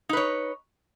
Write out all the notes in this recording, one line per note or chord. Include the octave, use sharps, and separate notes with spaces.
D#4 B4 C#5